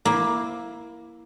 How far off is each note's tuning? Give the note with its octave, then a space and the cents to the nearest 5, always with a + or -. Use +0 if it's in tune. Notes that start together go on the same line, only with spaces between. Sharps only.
A#3 +15 E4 +0